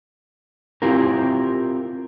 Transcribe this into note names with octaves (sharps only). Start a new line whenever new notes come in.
C4 E4 F4 G4 A#4